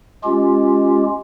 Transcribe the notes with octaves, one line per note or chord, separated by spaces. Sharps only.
G#3 C#4 F4 G4